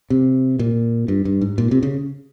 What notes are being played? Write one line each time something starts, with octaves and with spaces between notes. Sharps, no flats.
C3
A#2
G2
G2
G#2
A#2
C3
C#3